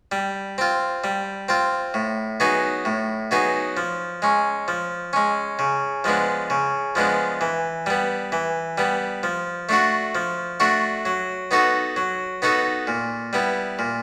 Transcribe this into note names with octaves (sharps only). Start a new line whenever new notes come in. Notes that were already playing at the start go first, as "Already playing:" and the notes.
G3
C4 F4
G3
C4 F4
A2
F#3 B3 D#4 G#4
A2
F#3 B3 D#4 G#4
F3
G#3 C#4
F3
G#3 C#4
C#3
F3 G#3 B3 D4
C#3
F3 G#3 B3 D4
E3
G3 B3
E3
G3 B3
F3
A3 D4 F#4
F3
A3 D4 F#4
F#3
B3 D#4 F#4 A4
F#3
B3 D#4 F#4 A4
A#2
G3 B3 E4
A#2